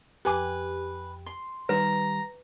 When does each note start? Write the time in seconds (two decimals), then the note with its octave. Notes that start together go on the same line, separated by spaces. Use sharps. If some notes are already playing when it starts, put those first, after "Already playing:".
0.25 F2 G4 B4 G#5 D6
1.26 C6
1.69 D#3 G3 B4 A#5